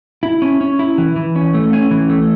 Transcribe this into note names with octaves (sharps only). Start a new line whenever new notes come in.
E4
C#4
C#4
E4
E3
E3
C#4
A3
C#4
E3
A3